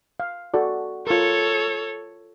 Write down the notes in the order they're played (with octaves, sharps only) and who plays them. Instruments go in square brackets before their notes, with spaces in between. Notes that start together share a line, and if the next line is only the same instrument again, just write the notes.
[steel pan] F5
F#4 A4 D5
[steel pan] F4 A#4 [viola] A4 C#5